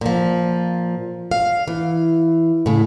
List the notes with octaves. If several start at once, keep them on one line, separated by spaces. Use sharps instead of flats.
A#2 F3
F5
E3
A2 C#3